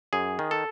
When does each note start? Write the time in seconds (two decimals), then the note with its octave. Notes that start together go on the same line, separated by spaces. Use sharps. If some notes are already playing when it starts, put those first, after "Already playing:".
0.13 F#2 G#4
0.39 D#3
0.51 A4